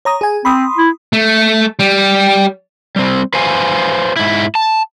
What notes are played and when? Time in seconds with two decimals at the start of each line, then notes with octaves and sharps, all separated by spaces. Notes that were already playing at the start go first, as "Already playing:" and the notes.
0.05 C#5 A#5 D#6
0.21 G#4 G#5
0.45 C4 B5 C6 D#6
0.77 E4
1.13 A3
1.79 G3
2.96 G3 C4
3.34 B4 C5 F5 G#5
4.16 G#2 E4
4.55 A5